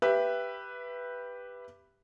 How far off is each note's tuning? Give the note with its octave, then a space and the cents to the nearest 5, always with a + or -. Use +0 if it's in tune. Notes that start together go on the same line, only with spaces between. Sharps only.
G4 +0 B4 +0 E5 +15